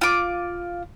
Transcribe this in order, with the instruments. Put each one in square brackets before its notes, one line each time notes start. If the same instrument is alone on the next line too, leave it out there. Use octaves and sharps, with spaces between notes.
[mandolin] F4 D6